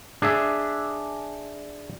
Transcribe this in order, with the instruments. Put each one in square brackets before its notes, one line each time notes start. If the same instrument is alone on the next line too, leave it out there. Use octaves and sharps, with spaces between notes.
[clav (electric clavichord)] D4 G#4 E5